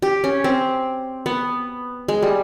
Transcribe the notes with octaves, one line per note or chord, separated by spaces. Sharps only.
G4
C#4
C4
B3
G#3
G3